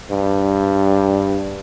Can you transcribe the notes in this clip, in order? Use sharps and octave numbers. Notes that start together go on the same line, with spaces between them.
G2